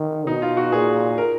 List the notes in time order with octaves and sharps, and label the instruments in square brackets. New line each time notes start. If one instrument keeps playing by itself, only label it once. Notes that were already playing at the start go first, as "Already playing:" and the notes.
Already playing: [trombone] D#3
[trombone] B2 [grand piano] D#4
[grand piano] F4
F#4
[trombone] A#2 [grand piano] G#4
[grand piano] A#4